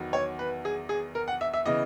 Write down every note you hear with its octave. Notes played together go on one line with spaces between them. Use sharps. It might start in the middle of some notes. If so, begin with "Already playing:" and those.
Already playing: E2 D#3 F#3 B3
C#5
B4
G#4
G#4
A#4
F#5
E5
E5
C#3 E3 B3 D#5